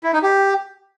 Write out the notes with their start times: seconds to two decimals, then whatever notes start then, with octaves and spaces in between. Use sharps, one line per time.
0.03 E4
0.13 D#4
0.23 G4